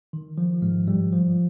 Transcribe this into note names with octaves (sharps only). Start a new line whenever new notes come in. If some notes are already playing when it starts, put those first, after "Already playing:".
D#3
F3
G#2 G#3
G2 G3
F3